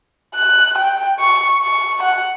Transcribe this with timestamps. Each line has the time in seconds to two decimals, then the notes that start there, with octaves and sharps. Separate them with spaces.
0.35 F#6
0.78 G5
1.20 C#6
1.62 C#6
2.03 F#5